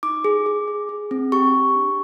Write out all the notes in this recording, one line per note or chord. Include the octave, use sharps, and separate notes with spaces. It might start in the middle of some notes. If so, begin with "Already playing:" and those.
D#4 D6
G#4
G#4
G#4
G#4
C4
G4 C#6
G4
D4